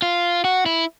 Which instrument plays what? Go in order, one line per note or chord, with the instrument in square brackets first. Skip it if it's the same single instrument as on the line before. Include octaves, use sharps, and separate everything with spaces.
[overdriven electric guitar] F4
F#4
E4